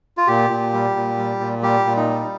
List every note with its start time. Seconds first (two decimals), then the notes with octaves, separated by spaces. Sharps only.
0.18 F4
0.27 A#2 G4
0.50 A#2
0.73 G3
0.96 A#2
1.18 G3
1.40 A#2
1.62 G3 G4
1.86 A#2
1.97 D#4
2.09 G3